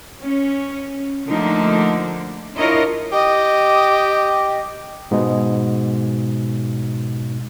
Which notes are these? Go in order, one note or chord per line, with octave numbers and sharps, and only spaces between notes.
C#4
D3 F3 A3 A#3 D4 D#4
D4 E4 F4 A#4 C#5 D#5
G4 D#5
G#2 B2 G#3